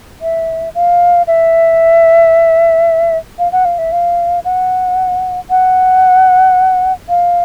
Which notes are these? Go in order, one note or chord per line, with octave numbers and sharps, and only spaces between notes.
E5
F5
E5
F5
F#5
F5
E5
F5
F#5
F#5
F5